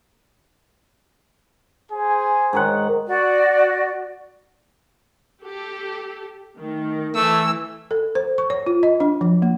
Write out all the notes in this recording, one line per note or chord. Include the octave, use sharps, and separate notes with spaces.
G#4 C5 G#5
G#2 D#3 F#5
F#4 D5
G4 A4
D#3 A3
E3 A3 E6
A4
C5
C#6
C#5
F4
D#5
D4
F3
A#3